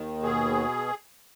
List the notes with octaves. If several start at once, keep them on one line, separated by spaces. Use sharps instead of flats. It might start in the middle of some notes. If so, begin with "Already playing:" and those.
Already playing: D#2 D#3
B2 G#4